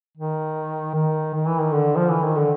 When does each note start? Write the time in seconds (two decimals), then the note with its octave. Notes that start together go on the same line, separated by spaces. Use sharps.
0.17 D#3
0.95 D#3
1.34 D#3
1.47 E3
1.60 D#3
1.73 D3
1.96 F3
2.10 E3
2.23 D#3
2.37 D3